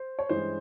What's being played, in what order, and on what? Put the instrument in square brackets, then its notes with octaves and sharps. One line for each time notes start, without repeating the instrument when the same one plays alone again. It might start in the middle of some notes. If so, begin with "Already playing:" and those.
Already playing: [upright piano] C5
C#5
G2 E3 G#3 C#4 C5